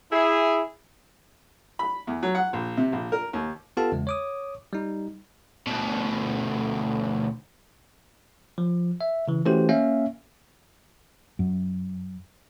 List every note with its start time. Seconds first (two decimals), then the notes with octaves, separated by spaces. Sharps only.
0.12 E4 G#4
1.79 B5
2.07 E2
2.23 F#3
2.35 F#5
2.53 A#1
2.77 C3
2.92 A#1
3.12 A#4
3.33 D#2
3.77 B3 F4 G4 A4 F5 A5
3.92 E2 C#3 G#3
4.07 C#5 D6 D#6
4.73 G3 D#4
5.67 D2 B2
8.58 F3
9.01 E5
9.28 C#3 E3
9.45 E3 A3 C#4 F#4 G4 C5
9.69 A#3 C#4 E5 F5
11.39 F#2